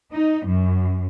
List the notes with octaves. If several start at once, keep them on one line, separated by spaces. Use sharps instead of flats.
D#4
F#2